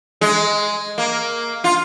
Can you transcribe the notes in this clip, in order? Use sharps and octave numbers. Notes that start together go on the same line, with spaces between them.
G#3
A#3
F4